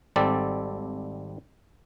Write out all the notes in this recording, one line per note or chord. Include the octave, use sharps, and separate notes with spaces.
G#1 G3 C4 A4 D5